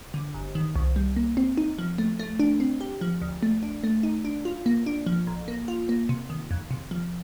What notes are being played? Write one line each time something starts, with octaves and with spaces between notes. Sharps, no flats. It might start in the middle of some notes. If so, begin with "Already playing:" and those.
D3
G1
D#3
C2
G3
A#3
C4
D#4
F3
A3
A3
D4
C4
G4
F3
D2
A3
D4
A3
D#4
D4
F4
A#3
D4
F3
A1
A#3
F4
A#3
C3
D#3
F2
C3
F3